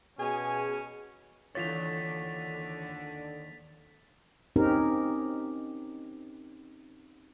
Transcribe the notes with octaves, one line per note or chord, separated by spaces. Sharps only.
B2 C#4 G#4 G#5
D#2 D3 E3 F4 C#5 A6 B6 F7
C4 C#4 D#4 G4 A#4